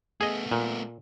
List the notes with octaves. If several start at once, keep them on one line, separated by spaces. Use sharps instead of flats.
A3 B3 G#4 D#5
A#2